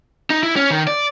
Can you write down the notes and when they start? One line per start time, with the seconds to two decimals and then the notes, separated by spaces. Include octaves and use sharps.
0.30 D#4
0.43 E4
0.56 C#4
0.71 D#3
0.87 D5